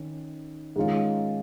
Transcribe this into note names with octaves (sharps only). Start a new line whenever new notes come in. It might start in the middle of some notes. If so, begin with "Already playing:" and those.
Already playing: D#3 C#4
G#2 D#3 G#3 C#4 F4